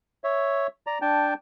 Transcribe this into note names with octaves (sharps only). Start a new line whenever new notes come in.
C#5 E5
D5 A#5
D4 G5 A5